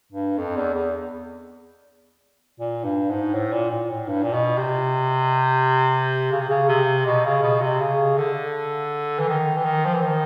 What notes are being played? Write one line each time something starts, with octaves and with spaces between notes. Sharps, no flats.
G2
F2
E2
E2
A#2
G2
G#2
A2
A#2
A#2
A2
G2
A#2
B2
C3
C#3
C3
C#3
C3
B2
C#3
B2
C3
C#3
D3
E3
D#3
E3
D#3
F3
E3
D#3